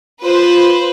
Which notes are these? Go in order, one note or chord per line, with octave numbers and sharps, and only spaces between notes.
F4 B4 C5